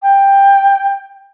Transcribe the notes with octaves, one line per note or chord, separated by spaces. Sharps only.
G5